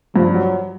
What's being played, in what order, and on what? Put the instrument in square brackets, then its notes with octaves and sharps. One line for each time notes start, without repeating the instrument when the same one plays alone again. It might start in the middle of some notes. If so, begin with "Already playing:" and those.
[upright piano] G2 [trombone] F3
[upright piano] F#3